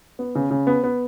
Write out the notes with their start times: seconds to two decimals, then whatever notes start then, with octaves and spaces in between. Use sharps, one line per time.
0.19 B3
0.35 C#3
0.51 C#3
0.67 B3
0.84 B3